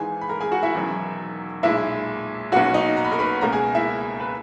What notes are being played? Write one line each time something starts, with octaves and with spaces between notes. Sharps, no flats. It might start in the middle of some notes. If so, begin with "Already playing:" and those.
Already playing: G#1 G#2 E3 G#4 G#5
B5
A#4 A#5
G#4 G#5
F#4 F#5
E4 E5
E1 E2 D#3 F#3 C#4
B1 A#2 G#3 E4 E5
B1 B2 A#3 C#4 F#4 F#5
D#4 D#5
A#5
B5
A#4 A#5
B4 B5
C#2 B2 A#3 C#4 A#4 A#5
G#4 G#5
E4 E5
B4